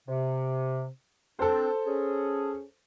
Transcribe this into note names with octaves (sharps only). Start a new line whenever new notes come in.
C3
C4 D4 A4 C5
C#4 G#4